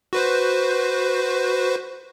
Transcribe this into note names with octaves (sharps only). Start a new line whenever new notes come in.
F#4 B4 C5